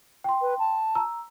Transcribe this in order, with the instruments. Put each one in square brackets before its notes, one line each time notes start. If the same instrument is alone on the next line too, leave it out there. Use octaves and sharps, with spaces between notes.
[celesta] G5 C6
[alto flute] B4
A5
[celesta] A#5 E6